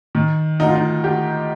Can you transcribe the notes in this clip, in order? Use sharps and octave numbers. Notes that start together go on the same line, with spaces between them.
D#3
D2 D#4
F4
D#4
D2 G4